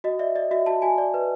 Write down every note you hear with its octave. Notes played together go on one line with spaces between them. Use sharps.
F#4 D#5
D5 E5
D5 D#5
F#4 E5
F#4 A5
F#4 G#5
D5
B4